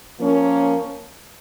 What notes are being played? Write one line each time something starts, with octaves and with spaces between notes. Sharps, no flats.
F3 A#3 C#4